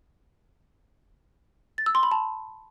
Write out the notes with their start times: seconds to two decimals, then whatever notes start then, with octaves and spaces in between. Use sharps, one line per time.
1.78 A6
1.86 E6
1.95 C6
2.03 B5
2.11 A5